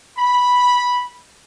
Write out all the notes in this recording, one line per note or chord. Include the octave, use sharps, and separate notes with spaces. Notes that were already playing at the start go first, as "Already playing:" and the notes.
B5